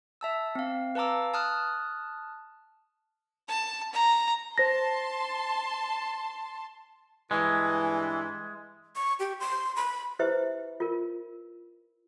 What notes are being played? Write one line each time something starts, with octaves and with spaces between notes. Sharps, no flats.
E5 A5 E6
C4 F5
B4 F5 A5 A#5 D6 E6
A5 D#6 F6 F#6
A5
A#5
C5 A5 C6 A#6
G2 E3 G#3
C#6
G4
C6
B5
E4 G4 B4 C5 E5
F4 A#4